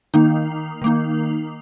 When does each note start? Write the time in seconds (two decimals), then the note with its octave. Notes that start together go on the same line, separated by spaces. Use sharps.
0.14 D#3 A#3 D#4
0.82 D#3 A#3 D#4